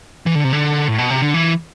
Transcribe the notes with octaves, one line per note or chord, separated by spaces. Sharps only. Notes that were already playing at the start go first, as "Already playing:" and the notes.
E3
D3
C3
D3
A2
B2
C3
D3
E3